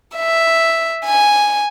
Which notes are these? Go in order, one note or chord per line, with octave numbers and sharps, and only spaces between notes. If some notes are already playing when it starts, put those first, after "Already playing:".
E5
G#5